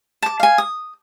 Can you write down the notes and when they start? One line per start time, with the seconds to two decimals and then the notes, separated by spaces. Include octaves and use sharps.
0.22 A5 D6
0.40 F5 G#5
0.58 D#6